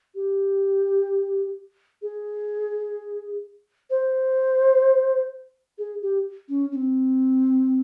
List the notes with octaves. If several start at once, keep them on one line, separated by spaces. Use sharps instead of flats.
G4
G#4
C5
G#4
G4
C#4
C#4
C4